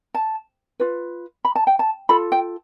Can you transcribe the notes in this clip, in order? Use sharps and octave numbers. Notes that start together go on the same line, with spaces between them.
A5
F4 B4
B5
A5
G5
A5
F4 A4 B5
G5